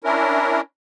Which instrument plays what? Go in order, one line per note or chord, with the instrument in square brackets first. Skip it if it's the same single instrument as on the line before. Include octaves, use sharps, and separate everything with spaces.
[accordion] C#4 D4 E4 A#4